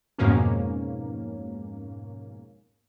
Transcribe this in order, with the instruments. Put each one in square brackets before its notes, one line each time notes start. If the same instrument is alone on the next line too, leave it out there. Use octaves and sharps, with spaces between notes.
[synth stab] F2 G#2 B2 A#3 C#4